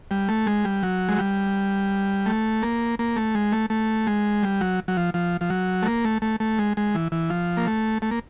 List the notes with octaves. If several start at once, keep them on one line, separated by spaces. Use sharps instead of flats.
G3
A3
G#3
G3
F#3
G#3
G3
A3
A#3
A#3
A3
G#3
A3
A3
G#3
G3
F#3
F#3
F3
F3
F3
F#3
A3
A#3
A3
A3
A3
G#3
G#3
E3
E3
F3
A#3
A3
A3
A#3